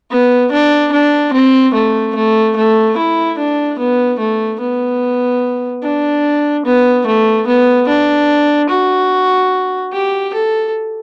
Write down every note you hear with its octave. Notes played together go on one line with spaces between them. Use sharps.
B3
D4
D4
C4
A3
A3
A3
E4
D4
B3
A3
B3
D4
B3
A3
B3
D4
F#4
G4
A4